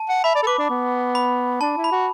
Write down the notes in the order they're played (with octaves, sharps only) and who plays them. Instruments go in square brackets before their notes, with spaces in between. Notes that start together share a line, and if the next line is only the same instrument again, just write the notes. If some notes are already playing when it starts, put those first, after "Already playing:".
Already playing: [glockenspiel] A5
[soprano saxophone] F#5
[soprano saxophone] E5 [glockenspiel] B5
[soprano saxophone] D5
A4
[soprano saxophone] B4 [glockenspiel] D6
[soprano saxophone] D4
B3
[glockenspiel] B5
[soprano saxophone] D4 [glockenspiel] A5
[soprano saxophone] E4
[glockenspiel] B5
[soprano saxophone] F#4